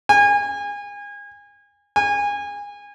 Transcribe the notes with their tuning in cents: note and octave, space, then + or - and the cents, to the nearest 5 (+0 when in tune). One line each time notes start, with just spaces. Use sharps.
G#5 -30
G#5 -25